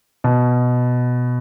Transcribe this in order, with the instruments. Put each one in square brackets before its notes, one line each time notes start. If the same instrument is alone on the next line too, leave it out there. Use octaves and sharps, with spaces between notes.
[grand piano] B2